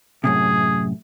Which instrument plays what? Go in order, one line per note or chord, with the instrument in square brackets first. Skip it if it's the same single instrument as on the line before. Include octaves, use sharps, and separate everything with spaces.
[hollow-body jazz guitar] F#2 A2 C3 [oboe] G#4